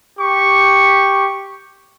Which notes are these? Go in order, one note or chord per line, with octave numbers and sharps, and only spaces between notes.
G4 C#6